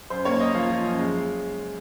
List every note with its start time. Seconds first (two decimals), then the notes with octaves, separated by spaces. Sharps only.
0.10 F#2 C5
0.25 A#3 C#5
0.40 A#3 D#5
0.55 F3 F5
0.70 F3
0.84 F#2
0.99 G#3